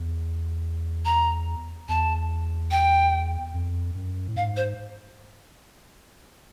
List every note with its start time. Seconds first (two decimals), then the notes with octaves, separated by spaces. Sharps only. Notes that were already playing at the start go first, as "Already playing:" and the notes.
Already playing: E2
1.05 A#5
1.88 E2 A5
2.71 G5
3.54 F2
3.95 F#2
4.28 A2
4.36 G#2 F5
4.57 C5